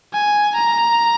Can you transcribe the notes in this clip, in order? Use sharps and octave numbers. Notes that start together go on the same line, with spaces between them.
G#5
A#5